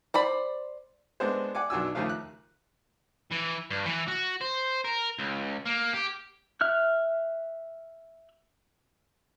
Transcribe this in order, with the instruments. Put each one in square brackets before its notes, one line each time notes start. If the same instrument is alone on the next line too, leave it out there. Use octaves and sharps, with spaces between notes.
[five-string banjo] C5 D5 B5
[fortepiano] G#3 B3 C4 D4 A4 C5
D5 F#5 G#5 D6
B1 B2 D4 F#4 G#5 E6
D#2 C#3 F3 A3 F5
F#6
[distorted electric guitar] E3
G2
E3
F#4
C5
A#4
C#2
A#3
G4
[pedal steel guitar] E5 F6 F#6